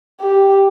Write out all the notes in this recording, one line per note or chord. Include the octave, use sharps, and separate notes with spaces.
G4